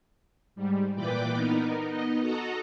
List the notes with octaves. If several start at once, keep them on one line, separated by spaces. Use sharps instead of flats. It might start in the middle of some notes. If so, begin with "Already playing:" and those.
G#2 G3
A#2 E3 B4 D5 G5 D6
B3 D#4 A#4
B3 D#4 D#5
F#4 A4 D#5 F#5 A#5